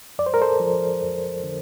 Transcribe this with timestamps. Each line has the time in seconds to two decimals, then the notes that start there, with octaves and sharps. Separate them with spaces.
0.19 F2 D5
0.26 C5
0.34 A#4
0.42 A4 C5
0.60 F3
1.02 F2
1.44 D3